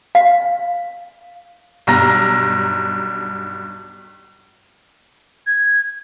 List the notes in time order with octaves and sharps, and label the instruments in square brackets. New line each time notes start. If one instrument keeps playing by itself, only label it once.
[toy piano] F5
[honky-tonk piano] B1 G2 A#5 A#6
[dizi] G#6